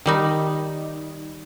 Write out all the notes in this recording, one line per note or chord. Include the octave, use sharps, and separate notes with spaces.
D#3 G3 D#4